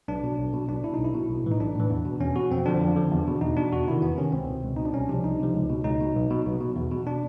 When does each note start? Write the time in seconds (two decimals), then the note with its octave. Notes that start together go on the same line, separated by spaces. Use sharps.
0.08 B1 D4
0.23 B2
0.39 B1
0.53 B2
0.69 B1 D4
0.84 B2 E4
0.94 B1 D#4
1.04 E4
1.14 B2
1.29 B1
1.44 A2 E3
1.51 D#4
1.59 B1 D4
1.75 A2 E3
1.90 E2
2.05 B2
2.21 E2 C#4
2.36 B2 F#4
2.51 F2 C4
2.66 D3 F3 D4
2.81 F2
2.96 D3 F3
3.12 E2
3.27 B2
3.41 E2 D#4
3.57 B2 D4
3.72 E2 F#4
3.87 C3 D#3 E4
4.02 E2 B3
4.18 C3 D#3 C#4
4.32 C#2 C4
4.48 B2
4.63 C#2
4.76 B2 D#4
4.85 D4
4.94 C2 C#4
5.09 C3 F3 D4
5.24 C2 D#4
5.39 C3 F3
5.54 C#2
5.69 B2
5.84 C#2 D#4
6.01 B2
6.15 B1
6.30 B2
6.46 B1
6.60 B2
6.76 E2
6.91 B2
7.06 D4